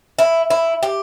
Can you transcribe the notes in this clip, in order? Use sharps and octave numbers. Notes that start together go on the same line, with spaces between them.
E4
E4
G4